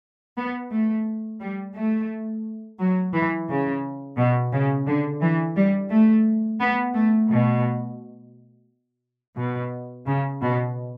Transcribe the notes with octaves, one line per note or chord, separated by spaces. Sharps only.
B3
A3
G3
A3
F#3
E3
C#3
B2
C#3
D3
E3
G3
A3
B3
A3
B2
B2
C#3
B2